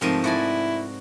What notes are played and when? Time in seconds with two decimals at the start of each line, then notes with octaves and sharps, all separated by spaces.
0.01 G#2 C3 F3 A3 A#4 D#6
0.24 E4 F#4 D5 G#5